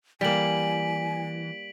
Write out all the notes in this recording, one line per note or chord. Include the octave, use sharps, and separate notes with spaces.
E3 G3 A#3 G#5 B6 D7 F#7